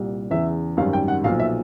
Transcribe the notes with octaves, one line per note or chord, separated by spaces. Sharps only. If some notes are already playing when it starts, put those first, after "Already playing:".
Already playing: C2 A#2 G3
E2 C#3 E3 E5
G#1 F#2 D#3 G3 F5
G5
F#5
B1 A#2 F3 F5
E5